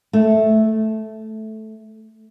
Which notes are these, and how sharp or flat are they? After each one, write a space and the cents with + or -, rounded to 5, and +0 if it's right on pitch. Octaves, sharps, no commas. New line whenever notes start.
A3 -10